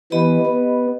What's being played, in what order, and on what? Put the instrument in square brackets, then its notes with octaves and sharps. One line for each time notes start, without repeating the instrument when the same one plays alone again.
[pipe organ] E3 B3 [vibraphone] G4 D#5 B5
[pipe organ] B3